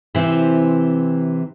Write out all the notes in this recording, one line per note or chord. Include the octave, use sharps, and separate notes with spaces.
C3 E3 C4 E4